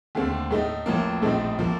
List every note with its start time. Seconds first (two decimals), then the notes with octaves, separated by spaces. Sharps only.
0.15 D#2 D3 A3 C4
0.50 A2 A3 D#4
0.86 A1 A2 F3 A#3
1.22 A#1 A2 A3 C4 D#4
1.58 A2 F3 A#3